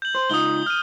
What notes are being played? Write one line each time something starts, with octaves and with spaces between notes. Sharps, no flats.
G6 F#7
C5
C#2 D#4 F4 D#6 G7
F6 D#7